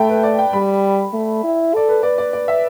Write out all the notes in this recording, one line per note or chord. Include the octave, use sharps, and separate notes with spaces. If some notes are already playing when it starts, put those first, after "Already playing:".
Already playing: A3 G5 A5 B5
B4
D5
G5
G3 B5
A3
E4
A4 D5
B4
B4 D5
D5
D5
E5